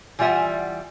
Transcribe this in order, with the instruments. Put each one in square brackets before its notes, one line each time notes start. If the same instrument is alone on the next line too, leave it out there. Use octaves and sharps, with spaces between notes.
[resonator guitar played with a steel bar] E3 G3 F4 E5 F#5 G#5